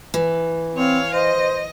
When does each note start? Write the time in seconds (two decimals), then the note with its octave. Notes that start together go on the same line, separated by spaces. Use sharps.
0.14 E3
0.76 C4 C#5 F5
1.14 C5 D#5